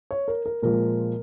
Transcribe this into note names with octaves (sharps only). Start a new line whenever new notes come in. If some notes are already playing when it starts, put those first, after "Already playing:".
C#5
A#4
A#4
A#2 F3 G#3 A#4